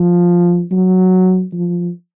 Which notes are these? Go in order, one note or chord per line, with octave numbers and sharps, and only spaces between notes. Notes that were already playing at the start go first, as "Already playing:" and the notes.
Already playing: F3
F#3
F3